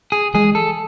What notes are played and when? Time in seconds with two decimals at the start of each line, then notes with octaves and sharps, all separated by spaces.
0.12 G#4
0.34 E3 G#3 G#4
0.55 A4